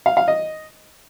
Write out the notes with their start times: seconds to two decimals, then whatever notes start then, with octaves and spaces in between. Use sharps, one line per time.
0.06 F5
0.17 F5
0.28 D#5